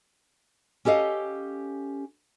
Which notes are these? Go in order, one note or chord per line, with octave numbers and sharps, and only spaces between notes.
C#4 G4 A4 D#5 F5